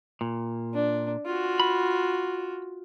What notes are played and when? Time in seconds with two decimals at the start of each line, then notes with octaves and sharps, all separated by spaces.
0.21 A#2
0.74 D4
1.26 F4 F#4
1.60 B5